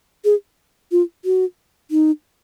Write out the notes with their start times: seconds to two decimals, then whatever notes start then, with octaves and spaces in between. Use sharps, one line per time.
0.25 G#4
0.92 F4
1.25 F#4
1.91 D#4